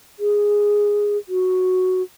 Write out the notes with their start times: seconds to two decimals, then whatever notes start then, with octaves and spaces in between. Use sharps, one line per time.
0.20 G#4
1.29 F#4